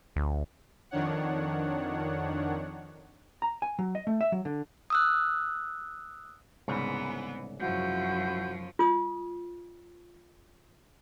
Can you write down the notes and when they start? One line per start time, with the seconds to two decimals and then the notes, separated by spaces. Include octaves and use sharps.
0.16 D2
0.91 F2 D#3 D4 C#5 F#5
3.42 A#5
3.62 G#5
3.79 F#3
3.95 D#5
4.07 A3
4.21 E5
4.32 F#3
4.45 D3
4.90 D#6 E6 F#6
6.68 C2 G#2 C#3 E3 B3
7.59 F#2 F3 E4 F#4 G6
8.79 F4 D#6